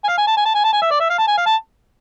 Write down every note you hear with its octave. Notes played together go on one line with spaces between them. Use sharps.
G#5
F5
G#5
A5
G#5
A5
G#5
A5
G#5
E5
D5
E5
F5
A5
G#5
F5
A5